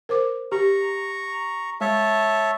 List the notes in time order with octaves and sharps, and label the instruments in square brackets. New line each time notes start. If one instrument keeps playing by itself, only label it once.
[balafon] A#4 C5 D6
[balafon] G4 [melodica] A#5 C#6
[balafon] G#3 [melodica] C#5 E5 A5